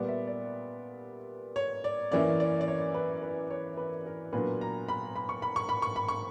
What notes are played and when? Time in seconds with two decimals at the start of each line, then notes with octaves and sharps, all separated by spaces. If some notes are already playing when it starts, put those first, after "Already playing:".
Already playing: A#2 G3 B3 D5
0.08 E5
0.27 D5
1.56 C#5
1.84 D5
2.11 F#2 E3 A#3 C#4 E4 D5
2.40 D5
2.61 D5
2.68 C#5
2.94 B4
3.22 B4
3.50 C#5
3.77 B4
4.06 A#4
4.33 A#2 F#3 B3 D4 B4
4.61 A#5
4.88 B5
5.16 B5
5.29 C#6
5.42 B5
5.56 C#6
5.69 B5
5.82 C#6
5.96 B5
6.08 C#6